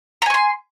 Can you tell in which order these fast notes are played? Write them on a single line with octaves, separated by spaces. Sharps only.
A#5 G#5 C#6 C6